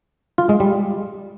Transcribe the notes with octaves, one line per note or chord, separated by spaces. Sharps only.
F4
G#3
G3